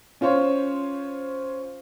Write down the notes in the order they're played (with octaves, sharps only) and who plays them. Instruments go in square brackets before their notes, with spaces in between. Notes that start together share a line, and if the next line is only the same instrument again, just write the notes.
[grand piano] C#4 F4 C5 C#5